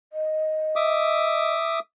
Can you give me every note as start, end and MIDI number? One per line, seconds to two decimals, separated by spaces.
0.13 1.53 75
0.76 1.79 76
0.76 1.79 86
0.76 1.79 87